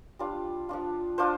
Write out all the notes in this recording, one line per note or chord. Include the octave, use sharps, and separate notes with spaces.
G3 D4 F4
F3 D4 F4
F3 D4 F4 C5